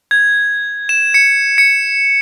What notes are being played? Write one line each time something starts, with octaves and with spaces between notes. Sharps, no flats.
G#6
E7
C#7
C#7